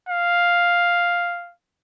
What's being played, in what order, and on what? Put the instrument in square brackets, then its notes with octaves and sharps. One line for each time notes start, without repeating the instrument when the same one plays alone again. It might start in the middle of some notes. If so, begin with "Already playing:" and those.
[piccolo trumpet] F5